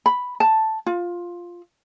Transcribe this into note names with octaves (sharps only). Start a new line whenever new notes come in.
B5
A5
F4